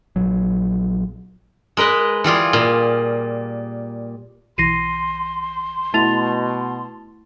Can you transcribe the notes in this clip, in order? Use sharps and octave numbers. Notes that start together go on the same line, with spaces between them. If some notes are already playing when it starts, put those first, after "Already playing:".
A#1 F#3
G#3 A#4 B4 D#5
E3 G3 F4 G#4
A#2 F5
B1 E3 C6 A#6 C7 D#7
B2 A3 E4 A5 A6 F7